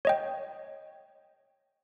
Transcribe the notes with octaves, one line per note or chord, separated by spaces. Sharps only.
C#5 D#5 G5